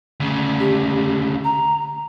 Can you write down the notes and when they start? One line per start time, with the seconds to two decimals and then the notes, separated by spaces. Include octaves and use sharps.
0.20 D2 C#3
0.60 G4
1.44 A#5